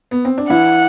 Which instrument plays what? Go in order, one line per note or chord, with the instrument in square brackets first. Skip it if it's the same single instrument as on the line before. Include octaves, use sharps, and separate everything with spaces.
[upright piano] B3
C4
D4
[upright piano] E3 E4 [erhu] F#5